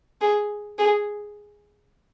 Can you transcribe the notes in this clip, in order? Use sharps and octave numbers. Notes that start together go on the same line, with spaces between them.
G#4
G#4